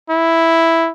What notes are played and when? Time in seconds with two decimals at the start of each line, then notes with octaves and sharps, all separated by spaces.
0.10 E4